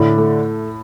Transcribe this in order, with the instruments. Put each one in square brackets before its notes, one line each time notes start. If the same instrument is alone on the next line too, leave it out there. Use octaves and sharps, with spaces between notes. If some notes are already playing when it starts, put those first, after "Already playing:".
Already playing: [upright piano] A2 [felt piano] D3
[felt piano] A3